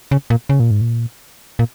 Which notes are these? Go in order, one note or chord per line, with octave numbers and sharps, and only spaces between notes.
C#3
A#2
C#3
A#2
G#2
A#2
A#2